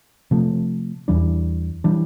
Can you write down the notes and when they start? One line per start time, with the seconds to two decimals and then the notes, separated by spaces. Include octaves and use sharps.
0.31 C3 F3 A3
1.08 E2 E3 G3 D4
1.84 E3 G3 D4